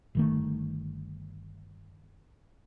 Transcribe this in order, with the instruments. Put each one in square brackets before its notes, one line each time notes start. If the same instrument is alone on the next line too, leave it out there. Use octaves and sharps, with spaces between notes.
[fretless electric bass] G1 D#3 A3